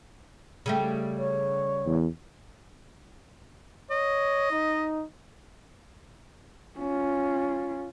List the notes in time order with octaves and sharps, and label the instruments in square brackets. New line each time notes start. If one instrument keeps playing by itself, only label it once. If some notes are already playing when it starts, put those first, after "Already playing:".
[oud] C#3 G3 A3
[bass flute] C#5
[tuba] E2
[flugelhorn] C#5 [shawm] D#5
[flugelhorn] D#4
[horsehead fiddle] C#4 F4